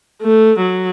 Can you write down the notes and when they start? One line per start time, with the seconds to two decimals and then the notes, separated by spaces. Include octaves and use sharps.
0.22 A3
0.62 F#3